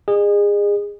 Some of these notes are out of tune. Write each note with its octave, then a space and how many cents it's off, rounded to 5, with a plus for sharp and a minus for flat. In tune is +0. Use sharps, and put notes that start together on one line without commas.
G#4 -25 D#5 -40